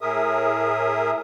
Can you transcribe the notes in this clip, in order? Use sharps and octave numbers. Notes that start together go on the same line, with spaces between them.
A2 G#4 A#4 E5 D#6